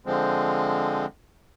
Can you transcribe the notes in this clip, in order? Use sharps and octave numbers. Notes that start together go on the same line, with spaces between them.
D3 F3 G#3 C4